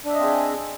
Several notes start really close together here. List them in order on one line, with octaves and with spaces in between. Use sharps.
D4 E5 D#5 C4 G#4